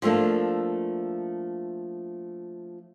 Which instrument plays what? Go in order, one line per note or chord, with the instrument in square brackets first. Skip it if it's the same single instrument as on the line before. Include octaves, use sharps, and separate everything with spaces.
[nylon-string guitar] F3 G3 A3 A#3 D4